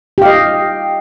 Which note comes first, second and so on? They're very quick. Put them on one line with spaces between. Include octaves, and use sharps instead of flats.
G4 F5 D#5